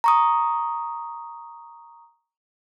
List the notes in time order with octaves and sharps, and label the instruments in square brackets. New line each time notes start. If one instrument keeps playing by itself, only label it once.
[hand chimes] A#5 C#6 D#6